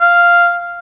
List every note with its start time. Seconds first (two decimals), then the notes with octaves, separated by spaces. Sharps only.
0.01 F5